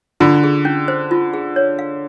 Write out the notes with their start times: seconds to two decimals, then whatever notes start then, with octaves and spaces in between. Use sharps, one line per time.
0.20 D3 F4
0.44 G#4
0.65 C#4
0.88 C5
1.11 F4
1.34 G#4
1.56 C#5
1.79 F5